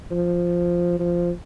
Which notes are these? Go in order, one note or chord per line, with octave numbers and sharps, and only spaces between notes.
F3
F3